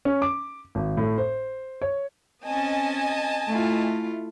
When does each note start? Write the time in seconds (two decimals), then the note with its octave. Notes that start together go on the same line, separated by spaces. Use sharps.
0.05 C#4
0.22 D6
0.75 G#1
0.97 A2
1.18 C5
1.82 C#5
2.45 C4 C#4 D#5 G#5 A5
3.48 A3 E4 F4